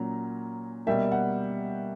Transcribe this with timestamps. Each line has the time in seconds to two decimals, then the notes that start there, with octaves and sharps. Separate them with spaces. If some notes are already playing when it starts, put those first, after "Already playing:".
Already playing: A#2 F#3 C#4 A#5
0.87 B2 G3 A#3 E5 G5
1.12 F#5